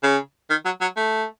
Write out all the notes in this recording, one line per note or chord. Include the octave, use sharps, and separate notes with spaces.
C#3
D#3
F#3
F#3
A3